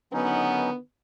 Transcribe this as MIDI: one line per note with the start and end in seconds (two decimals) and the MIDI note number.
0.13 0.77 50
0.13 0.77 51
0.13 0.70 54
0.13 0.77 59
0.13 0.70 61
0.13 0.70 63